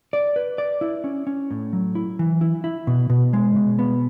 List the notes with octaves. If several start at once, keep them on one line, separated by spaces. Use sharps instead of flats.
D5
B4
D5
E4
C#4
C#4
A2
F#3
E4
E3
E4
E4
B2
B2
G#3
B2
B3